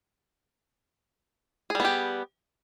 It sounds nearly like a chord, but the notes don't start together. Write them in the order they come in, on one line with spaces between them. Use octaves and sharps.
G#4 G3 B3 G4